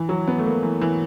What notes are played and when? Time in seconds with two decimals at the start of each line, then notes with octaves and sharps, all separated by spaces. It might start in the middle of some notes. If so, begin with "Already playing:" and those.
Already playing: E3
0.09 F#3
0.28 B3
0.38 A3
0.45 A#3
0.63 E3
0.81 E3